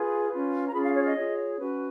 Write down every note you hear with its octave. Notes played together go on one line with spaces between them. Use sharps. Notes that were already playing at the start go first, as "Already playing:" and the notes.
Already playing: F4 G#4 B4
C#4 F4 B4
A#5
C#4 F4 G#4 B5
F5
C#5
D#5
F4 G#4 C#5
C#4 F#4 B4